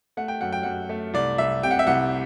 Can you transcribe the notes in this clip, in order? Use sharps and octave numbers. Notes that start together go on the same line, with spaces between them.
A3 F#5
G5
F#2 F#5
G5
F#2 F#5
A3
C2 D5
C2 E5
C3 G5
F#5
E5
C2 F#5